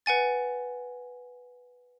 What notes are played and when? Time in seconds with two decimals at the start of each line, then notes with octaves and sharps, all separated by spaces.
0.06 B4 F#5 G#5 A6